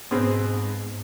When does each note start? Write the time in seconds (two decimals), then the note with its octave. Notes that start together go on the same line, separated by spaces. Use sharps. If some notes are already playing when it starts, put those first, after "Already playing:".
0.11 G#2 B2 G#3 C4